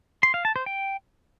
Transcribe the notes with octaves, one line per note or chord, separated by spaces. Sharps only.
C6
F5
A5
C5
G5